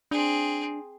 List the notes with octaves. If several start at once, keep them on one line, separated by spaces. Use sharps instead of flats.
C4 D4 G#4